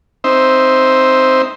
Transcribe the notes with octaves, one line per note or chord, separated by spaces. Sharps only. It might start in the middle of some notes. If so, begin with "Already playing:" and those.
C4 D#4 C5 E5